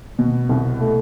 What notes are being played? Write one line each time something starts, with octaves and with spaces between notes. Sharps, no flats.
B2
C2
A3